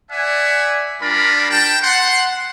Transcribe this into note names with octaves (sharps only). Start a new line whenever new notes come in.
D5 E5 F#5 G#5
G3 D4 F4 A#4 B5
G5 A5
F#5 C6